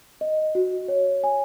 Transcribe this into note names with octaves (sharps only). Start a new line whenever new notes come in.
D#5
F#4
C#5
G#5